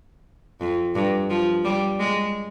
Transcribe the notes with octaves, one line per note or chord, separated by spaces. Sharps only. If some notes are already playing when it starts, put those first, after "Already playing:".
F2
G2
F3
G3
G#3